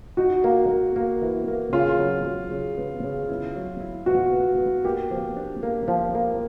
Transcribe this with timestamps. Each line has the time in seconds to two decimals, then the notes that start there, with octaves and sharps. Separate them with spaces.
0.17 D#4 F#4
0.44 A#3
0.69 A#3
0.96 A#3
1.22 E3
1.48 A#3
1.73 C#3 F4
1.99 F#3
2.25 F#3
2.51 C#3
2.77 B3
3.04 C#3
3.29 E4
3.56 F#3
3.80 E4
4.06 B2 F#4
4.32 B3
4.58 B3
4.84 A#3 G4
5.11 F3
5.37 D4
5.63 A#3
5.88 F3
6.15 A#3